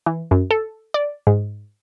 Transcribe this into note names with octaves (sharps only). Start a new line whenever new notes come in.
E3
F#2
A4
D5
G#2